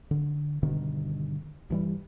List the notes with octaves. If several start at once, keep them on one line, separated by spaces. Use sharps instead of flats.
D3
G2 B2 D3 D#3
G2 E3 G3